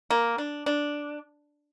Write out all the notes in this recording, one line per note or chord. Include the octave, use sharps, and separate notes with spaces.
A#3
D4
D4